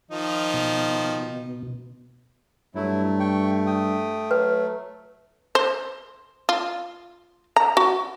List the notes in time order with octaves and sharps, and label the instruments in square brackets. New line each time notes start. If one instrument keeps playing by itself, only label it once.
[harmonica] D#3 F3 D#4
[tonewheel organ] B2
[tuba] G2 [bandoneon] F#3 E4 [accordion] A3
[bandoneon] G5 C#6
G5 D#6
[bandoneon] F#3 [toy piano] B4
[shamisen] C5
F4
A#5
F#4